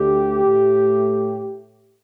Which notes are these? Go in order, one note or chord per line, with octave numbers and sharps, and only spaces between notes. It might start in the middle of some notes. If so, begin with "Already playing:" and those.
Already playing: D2 D3 A3 G4
A2 A3